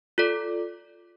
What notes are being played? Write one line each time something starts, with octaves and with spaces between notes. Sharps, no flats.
F4 A4 D5